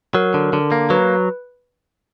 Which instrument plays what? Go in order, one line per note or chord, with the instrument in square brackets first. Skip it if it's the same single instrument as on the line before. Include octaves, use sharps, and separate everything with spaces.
[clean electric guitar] F#3 [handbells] A#4
[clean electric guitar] D3
D3
A#3
[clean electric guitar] F#3 [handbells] B4